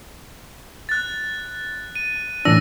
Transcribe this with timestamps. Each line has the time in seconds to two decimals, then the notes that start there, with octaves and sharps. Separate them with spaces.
0.89 F#6 A6
1.95 D#7
2.45 A2 E3 D4 E6 A#6